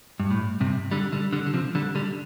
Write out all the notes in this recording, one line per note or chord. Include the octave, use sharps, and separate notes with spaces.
G2
A2
G2 C3
D3 G3
D3 G3
D3 G3
D3
C3 F3
D3 G3
D3 G3